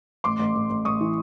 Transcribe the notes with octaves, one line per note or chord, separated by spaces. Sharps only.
A1 C6 D6
A1
A1
A1
A1 C#6 D#6
E3